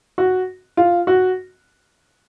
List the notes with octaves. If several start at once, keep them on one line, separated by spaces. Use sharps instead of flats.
F#4
F4
F#4